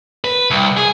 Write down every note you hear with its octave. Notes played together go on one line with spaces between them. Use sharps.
B4
C2
G#4